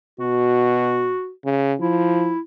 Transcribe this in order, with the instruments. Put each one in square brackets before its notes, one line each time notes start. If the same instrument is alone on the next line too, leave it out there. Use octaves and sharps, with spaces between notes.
[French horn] B2 [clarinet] F#4
[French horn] C#3
[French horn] F3 [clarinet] E4